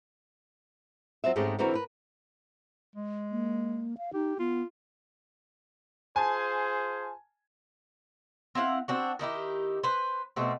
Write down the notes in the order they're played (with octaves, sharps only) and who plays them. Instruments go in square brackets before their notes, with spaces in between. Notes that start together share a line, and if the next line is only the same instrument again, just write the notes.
[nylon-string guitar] F#3 C4 F4 E5
G#2 G#3 A3 C4 C#4 G4
D3 E3 C4 F#4 A#4
A#4 B4
[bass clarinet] G#3
[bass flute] A#3
F5
[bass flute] D#4 [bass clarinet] G4
[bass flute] B3 [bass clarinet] F4
[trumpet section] F4 G#4 C5 [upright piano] G#5 A5
[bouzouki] C4 E4 F5 F#5
C4 D4 F#4
D#3 D#4 E4 G4
B4 C5
B2 A3 C4